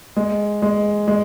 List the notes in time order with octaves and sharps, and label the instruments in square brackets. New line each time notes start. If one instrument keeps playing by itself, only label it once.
[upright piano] G#3
G#3
G#3